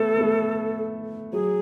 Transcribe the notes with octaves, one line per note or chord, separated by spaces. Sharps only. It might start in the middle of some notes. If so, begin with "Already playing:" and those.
Already playing: A3 B3 A4
B3
A3
F#3 G#4